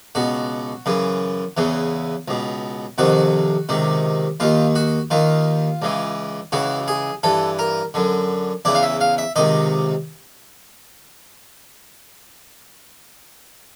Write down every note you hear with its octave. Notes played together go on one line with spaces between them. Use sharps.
C#2 B2 F#4
F#2 C#3 E3
E2 C#3 E3
C#2 B2
F2 C3 D#3 F#4
C#2 C3 D#3
D#2 D#3 F4
F#4
D#2 D#3 F4
C#2 C#3 E3
C#2 C#3 E3 F#4
G#4
G2 E3 A4
A#4
F#2 D3
E2 C#3 E3 D5
F5
E5
F5
E5
C#2 C3 D#3 D#5